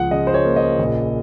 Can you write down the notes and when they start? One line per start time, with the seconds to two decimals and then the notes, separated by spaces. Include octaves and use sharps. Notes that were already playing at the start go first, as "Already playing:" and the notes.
Already playing: C#2 F3 F#5
0.11 C#3 D#5
0.27 C5
0.34 C#5
0.45 A#3
0.56 D#5
0.79 A#1